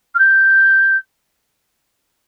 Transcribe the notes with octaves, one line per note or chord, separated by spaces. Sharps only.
F6
G6